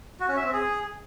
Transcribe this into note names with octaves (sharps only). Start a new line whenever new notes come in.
F#4
C#4
E5
C4
G#4